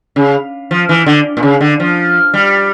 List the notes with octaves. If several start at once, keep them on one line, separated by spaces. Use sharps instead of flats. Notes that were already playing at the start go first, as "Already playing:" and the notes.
C#3
F3
E3
D3
A#2
C#3
D3
F3
G3